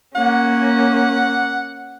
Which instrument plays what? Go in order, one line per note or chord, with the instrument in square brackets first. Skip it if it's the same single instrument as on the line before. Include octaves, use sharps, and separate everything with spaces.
[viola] A#3 C#4 [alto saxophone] F#5